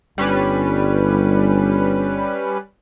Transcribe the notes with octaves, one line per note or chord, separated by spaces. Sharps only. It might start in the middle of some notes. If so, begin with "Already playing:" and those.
G1 G3 C#4 B4